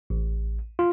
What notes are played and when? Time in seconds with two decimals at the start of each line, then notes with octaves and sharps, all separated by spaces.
0.10 A1
0.79 F4